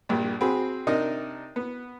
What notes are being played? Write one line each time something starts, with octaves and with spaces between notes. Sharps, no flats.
A#1 G2 A#2
C4 F#4 G#4 B5
C3 D4 D#4 A#4 D#5
B3